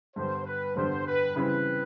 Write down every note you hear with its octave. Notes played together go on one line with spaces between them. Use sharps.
G2 D3 G3 B3 C5
B4
G2 D3 G3 B3 C5
B4
C#3 E3 G3 C4 B4